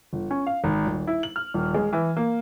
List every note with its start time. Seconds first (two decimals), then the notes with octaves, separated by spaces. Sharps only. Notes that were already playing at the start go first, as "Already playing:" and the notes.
0.13 G1
0.31 C#4
0.47 F5
0.64 G#1
0.86 D#1
1.07 E4
1.23 F#7
1.36 F6
1.54 D#1
1.74 G#3
1.93 E3
2.17 A#3